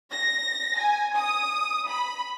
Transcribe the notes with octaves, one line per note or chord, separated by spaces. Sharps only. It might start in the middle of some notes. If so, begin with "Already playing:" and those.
A#6
G#5
D#6
B5